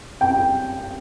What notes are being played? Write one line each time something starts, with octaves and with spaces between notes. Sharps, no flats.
G5